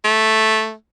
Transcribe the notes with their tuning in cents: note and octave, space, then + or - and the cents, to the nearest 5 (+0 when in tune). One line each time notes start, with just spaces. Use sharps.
A3 -5